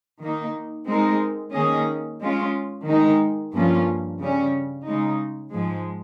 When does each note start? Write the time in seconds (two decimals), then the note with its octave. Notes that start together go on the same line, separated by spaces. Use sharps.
0.21 D#3 A#3 D#4
0.88 G#3 C4 D#4 A#4
1.54 D#3 A#3 C#4 G#4 D#5
2.20 G#3 C#4 F4
2.86 D#3 G#3 D#4
3.53 G2 F3 A#3 C#4 F4
4.18 C#3 G3 C#4
4.85 C#3 G#3 D#4
5.51 G#2 F3 G#3